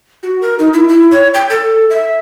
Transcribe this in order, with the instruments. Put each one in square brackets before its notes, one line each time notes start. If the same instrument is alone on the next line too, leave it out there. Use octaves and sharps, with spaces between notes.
[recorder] F#4
A#4
D#4
E4
E4
C#5
G5
A4
E5